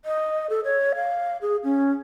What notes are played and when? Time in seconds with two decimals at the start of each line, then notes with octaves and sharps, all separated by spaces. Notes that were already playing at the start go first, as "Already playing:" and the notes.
0.05 D#5
0.50 A4
0.64 C#5
0.95 F5
1.42 G#4
1.64 C#4